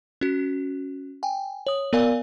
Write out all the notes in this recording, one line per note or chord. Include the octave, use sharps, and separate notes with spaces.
C#4 F#4
G5 G#5
C#5 D#6
B3 A#4 D5 F5 G#5